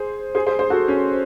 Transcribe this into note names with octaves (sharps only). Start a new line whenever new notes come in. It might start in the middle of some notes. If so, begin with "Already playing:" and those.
Already playing: G#4 C5
G#4 C5
G#4 C5
G#4 C5
F#4 A4
C#4